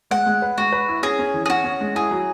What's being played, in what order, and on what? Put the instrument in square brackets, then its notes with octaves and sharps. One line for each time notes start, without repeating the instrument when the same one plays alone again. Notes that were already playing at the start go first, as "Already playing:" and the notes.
[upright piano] G#3 [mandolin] F#5
[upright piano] G#3
B4
[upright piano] G#3 [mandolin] F#4
[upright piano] B4
E4
[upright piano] C#4 [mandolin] G#4
[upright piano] C#4
E3
[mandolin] G#4
[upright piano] C#4 [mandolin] F#4
[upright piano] C#4
G#3
[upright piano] E4 [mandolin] G#4
[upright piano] F#3